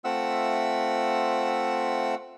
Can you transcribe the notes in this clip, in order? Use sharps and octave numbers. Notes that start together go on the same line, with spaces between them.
A3 C4 F4 E5 F#5 E6